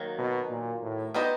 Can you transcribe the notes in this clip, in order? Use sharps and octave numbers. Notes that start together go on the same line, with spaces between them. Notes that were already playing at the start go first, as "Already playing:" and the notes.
Already playing: D#3 F#3 A#3
B2
A#2
A2
B3 D#4 G4 C5 D#5